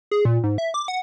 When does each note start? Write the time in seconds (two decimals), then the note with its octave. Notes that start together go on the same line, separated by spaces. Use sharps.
0.11 G#4
0.25 A#2
0.44 G#2
0.58 E5
0.74 D6
0.88 F#5